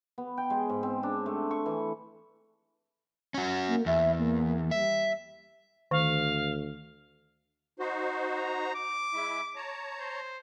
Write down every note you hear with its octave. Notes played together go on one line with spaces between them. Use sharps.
B3
G5
G#3
G#2
C4
D4
A3
C#6
E3
C#4 F#4
A#3
E2 E5
A#3
G3 E5
D2 D#3 F5
D#4 F#4 C5
A#5
D6
G#3 E4 E5
C#5 A5 A#5
C5